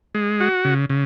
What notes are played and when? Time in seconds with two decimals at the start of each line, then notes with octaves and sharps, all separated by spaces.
0.15 G#3
0.40 F#4
0.65 C#3
0.90 C#3